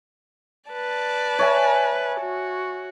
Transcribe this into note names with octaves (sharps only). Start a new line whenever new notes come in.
B4 D5 A5
C#5 E5 G#5
F#4